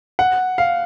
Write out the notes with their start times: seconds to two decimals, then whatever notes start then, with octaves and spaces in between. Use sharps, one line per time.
0.19 F#5
0.58 F5